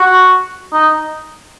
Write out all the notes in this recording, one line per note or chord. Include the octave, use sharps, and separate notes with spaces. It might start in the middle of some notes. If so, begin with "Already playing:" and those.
Already playing: F#4
D#4